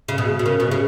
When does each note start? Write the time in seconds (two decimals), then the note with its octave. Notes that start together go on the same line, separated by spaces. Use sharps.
0.08 C#3
0.18 B2 G#4
0.39 B2
0.45 C#3 A#4
0.60 B2 F#4
0.71 C#3 G#4